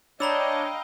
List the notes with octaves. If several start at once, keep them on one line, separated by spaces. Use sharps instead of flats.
D4 C#5 D#5 F5 G5 A#5 B5 E6